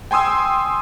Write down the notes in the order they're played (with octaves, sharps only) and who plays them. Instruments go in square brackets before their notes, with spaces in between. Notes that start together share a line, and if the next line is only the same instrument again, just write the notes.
[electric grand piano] G5 G#5 C6 D#6 E6